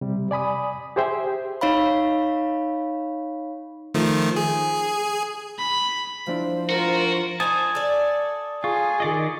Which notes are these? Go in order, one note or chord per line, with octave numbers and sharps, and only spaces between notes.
C3 G3
D5 G#5 B5 D#6
G4 G#4 C5 E5 G5
D#4 C#5 F5 B5
D#3 F3 A3
G#4
B5
F3 D4 E4 C5
F4 F#4 A#4
D#4 C5 G#5 A5 D#6
A4 D5
F4 G#4 C#6
D#3 D5 D#5